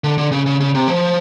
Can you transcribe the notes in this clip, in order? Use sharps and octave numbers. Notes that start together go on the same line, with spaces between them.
D3
D3
C#3
C#3
C#3
C3
F3